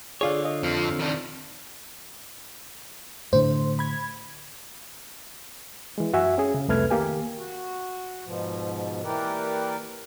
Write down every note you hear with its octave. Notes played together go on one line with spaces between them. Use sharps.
D3 F4 G#4 C#5 D5 F5
D#5
F2 F3 C4
D#3 D4
A2 D3 C5
B5 G#6
E3 G#3
F#2 F#4 E5 G#5
C#4 G#4
C#3
C2 F2 A3 B4 F6 G#6
D#3 A#3 G4 G#5
F#4
G#2 B2 F3
E3 A#3 G4 A#4 B4 D5